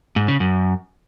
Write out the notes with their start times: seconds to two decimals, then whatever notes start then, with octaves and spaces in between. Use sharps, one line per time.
0.16 G#2
0.28 C#3
0.40 F#2